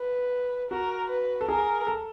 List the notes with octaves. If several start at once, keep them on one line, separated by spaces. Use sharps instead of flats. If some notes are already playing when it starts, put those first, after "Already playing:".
Already playing: B4
F#4 A#4
B4
A4
G#4 A#4
A4